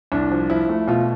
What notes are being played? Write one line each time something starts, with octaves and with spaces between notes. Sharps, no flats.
C2 D4
F3
F3 E4
A3
B2 F4